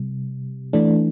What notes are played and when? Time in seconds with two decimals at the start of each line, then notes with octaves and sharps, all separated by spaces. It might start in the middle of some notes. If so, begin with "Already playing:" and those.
Already playing: C3 G3
0.73 E3 A3 D4